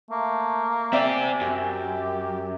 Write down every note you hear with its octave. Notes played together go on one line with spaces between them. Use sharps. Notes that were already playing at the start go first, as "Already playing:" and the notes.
A3 A#3
C4 G4 D5 E5 G#5
F#2 G4